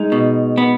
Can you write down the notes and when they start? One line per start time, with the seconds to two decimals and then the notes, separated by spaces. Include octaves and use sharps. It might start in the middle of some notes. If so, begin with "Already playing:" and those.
Already playing: G#3 D#4
0.12 B2
0.58 B3